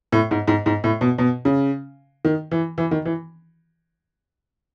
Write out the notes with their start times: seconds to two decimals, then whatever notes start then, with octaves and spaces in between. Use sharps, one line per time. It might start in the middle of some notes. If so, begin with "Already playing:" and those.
0.12 A2
0.31 G#2
0.48 G#2
0.66 G#2
0.84 A2
1.01 B2
1.18 B2
1.45 C#3
2.25 D#3
2.51 E3
2.78 E3
2.91 D#3
3.05 E3